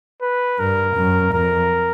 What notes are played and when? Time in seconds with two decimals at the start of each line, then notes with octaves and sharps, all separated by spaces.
0.22 B4
0.59 G2 A#4
0.96 F#2
1.33 F2 A#4